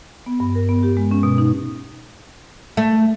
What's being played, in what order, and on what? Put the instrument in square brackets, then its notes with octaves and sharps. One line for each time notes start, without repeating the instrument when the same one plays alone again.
[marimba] B3
G2
A#4
B3
G4
G#3
C#4
B2
D#4
[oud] A3